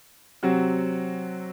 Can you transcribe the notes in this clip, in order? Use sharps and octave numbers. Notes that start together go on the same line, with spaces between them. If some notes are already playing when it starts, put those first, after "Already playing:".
C3 F#3 C4 F#4